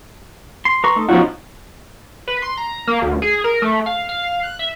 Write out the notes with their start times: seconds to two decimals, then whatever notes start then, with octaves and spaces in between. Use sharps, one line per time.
0.65 C6
0.84 B4 A#5 C#6
0.96 A3 D#4 A4
1.09 F#2 B2 F3 D#4 F4 F#5 C#6
2.28 B4
2.42 C6
2.57 A#5
2.88 A#3
3.02 D2
3.22 G#4
3.44 A#4
3.62 A3
3.86 F5
4.09 F5
4.43 F#6
4.59 E5